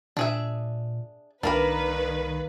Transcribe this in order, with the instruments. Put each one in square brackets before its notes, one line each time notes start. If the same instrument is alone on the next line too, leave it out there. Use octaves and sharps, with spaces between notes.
[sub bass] A#2 [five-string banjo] D4 G#4 E5
[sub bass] C2 [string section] D#3 B4 [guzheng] A#3 A#4 D5 [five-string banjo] D4 B5